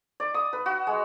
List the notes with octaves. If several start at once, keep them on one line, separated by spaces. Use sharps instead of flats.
D5
D#6
B4
F#4
G#3